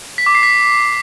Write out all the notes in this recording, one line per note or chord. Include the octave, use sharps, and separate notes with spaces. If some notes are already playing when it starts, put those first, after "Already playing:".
B6
D6
C7
B6